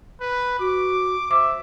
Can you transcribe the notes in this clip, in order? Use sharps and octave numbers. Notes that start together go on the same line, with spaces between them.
B4
F#4 D6
C5 E5 D6